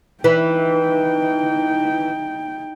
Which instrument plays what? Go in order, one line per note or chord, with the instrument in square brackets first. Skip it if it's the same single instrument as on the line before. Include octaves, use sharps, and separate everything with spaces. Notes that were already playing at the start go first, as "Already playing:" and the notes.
[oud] E3 [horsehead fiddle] D#4 G5